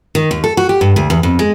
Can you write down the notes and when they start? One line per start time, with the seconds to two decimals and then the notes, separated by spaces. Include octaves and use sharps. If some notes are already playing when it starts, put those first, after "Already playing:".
0.15 D#3
0.31 D#2
0.44 A4
0.57 F#4
0.69 G4
0.81 G2
0.96 D2
1.10 E2
1.23 F2
1.39 G#3